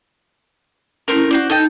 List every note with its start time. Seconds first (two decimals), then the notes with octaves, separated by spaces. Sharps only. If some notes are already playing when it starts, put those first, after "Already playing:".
1.08 A3 C4 C#4 E4 A#4
1.31 F#4 C5 D5
1.50 D#4 A4 D#5 G5